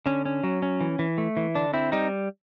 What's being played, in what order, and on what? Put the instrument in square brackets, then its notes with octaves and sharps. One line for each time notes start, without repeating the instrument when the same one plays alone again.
[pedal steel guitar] D3 C#4
C#4
F#3
C#4
E3
E3
A3
E3
D3 D4
C4 E4
G3 D#4